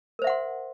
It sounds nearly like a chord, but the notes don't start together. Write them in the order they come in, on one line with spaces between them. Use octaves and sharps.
A#4 C5 E5 F#5 C6